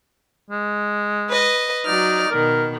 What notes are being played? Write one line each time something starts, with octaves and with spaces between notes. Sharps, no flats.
G#3
B4 D#5
F#3 D#4 D5 F6
B2 D#3 A#4